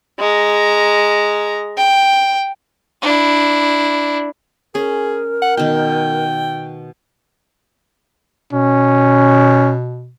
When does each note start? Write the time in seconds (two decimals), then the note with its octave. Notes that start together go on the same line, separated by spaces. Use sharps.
0.19 G#3 A#5
1.78 G5
3.02 D4 E4
4.75 C#4 G#4 A#4
5.42 F#5
5.57 B2 D#3 G5
8.53 B2 C#4